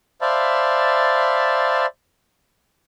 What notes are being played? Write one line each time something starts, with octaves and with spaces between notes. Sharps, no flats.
C5 D5 E5 F5 A5 B5